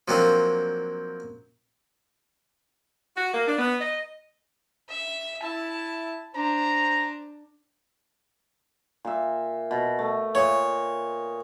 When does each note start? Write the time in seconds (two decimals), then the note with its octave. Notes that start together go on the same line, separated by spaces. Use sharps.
0.08 F3 F#3 A#3 C4 D4 A#4
3.17 F#4
3.33 A#3
3.47 D4
3.59 B3
3.80 D#5
4.89 E5
5.42 E4 A5
6.35 D4 C5 A#5
9.05 A#2 E5
9.71 B2
9.99 A3
10.35 A#2 C#5 D#5